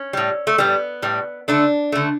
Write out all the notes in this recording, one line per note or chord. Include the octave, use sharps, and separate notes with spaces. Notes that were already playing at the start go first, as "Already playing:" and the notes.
Already playing: C#4
A2 G3
A3
A2 G3 B3
A2 G3
D3 A3 D4
D3 A3